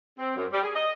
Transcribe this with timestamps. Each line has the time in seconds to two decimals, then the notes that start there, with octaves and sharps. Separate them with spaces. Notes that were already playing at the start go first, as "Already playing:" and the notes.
0.19 C4
0.36 F#2
0.52 G3
0.63 G#4
0.75 D#5